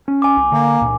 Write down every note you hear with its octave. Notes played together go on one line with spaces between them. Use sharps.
C#4
G#5 D6
C2
D3 A#3
C#2 A#2